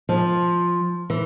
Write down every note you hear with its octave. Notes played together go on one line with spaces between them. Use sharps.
F3
E3